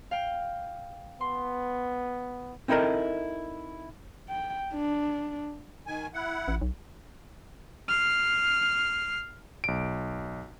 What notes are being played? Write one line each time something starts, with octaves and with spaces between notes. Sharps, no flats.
F5 G5
B3 C6
C4 D#4 E4 A4 A#4 D#5
G5
D4
D#3 G#5
E4 F#5
A1
B1
F6 C7
B1 D7